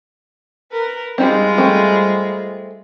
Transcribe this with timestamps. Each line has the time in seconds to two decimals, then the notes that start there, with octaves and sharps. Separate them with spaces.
0.71 A#4 B4
1.18 G3 G#3 C4 D#4 F4
1.58 A3 C4